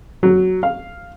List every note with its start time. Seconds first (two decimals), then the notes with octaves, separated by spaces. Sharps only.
0.23 F#3
0.63 F5